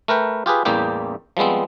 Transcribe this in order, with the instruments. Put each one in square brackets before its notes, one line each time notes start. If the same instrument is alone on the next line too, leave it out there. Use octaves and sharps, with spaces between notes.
[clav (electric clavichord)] A3 A#4 B4 G5
F4 G4 G#4 B4
A1 E2 G3 A#3 G4 G5
F3 G3 G#3 B3 C4